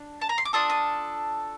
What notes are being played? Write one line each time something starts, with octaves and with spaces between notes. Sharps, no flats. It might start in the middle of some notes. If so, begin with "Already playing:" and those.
Already playing: D4
A5
A#5
C6
D6
D4 F4 A4 D#6
D#6